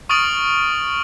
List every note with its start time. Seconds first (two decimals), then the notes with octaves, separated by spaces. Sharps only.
0.09 C#6 D#6 F6 A6 D7 F#7